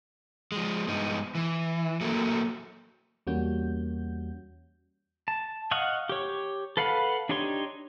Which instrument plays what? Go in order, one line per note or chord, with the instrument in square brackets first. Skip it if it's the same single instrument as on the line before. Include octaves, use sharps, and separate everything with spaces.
[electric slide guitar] F3 G#3
G2 G#3 B3 D#4
E3
F#3 A3 A#3
[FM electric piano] E2 G3 A#3 C#4 F#4 G6
[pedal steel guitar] A5
D#5 F5 F#5 C#6
G4 C#5
A4 B4 F5 F#5 B5
D4 D#4 G4 C#5 C6